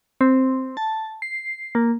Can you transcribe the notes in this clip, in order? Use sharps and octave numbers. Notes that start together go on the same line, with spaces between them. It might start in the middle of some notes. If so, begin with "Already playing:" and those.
C4
A5
C7
A#3